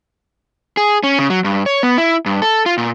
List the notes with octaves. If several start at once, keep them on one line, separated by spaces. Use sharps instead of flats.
G#4
C#4
C#3
F#3
G2
C#5
B3
E4
G2
A4
F4
A#2